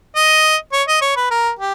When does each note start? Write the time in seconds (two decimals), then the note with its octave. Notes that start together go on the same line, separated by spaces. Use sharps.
0.16 D#5
0.73 C#5
0.88 D#5
1.02 C#5
1.16 B4
1.31 A#4
1.59 G4